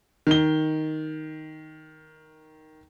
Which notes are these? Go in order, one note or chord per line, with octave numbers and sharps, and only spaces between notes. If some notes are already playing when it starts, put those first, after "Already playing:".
D#3 G7